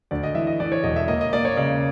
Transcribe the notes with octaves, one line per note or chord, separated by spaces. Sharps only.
D2 D5
D#5
E3 E5
D#5
E3 D5
C#5
E1 D#5
E5
A#3 D#5
D#5
A#3 D5
C#5
C#3 D5